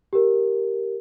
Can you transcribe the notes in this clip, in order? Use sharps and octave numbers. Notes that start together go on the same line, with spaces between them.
G4 A#4